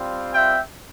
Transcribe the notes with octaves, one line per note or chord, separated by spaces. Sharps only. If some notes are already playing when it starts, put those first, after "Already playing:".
Already playing: G3 C4 F4
E5 G5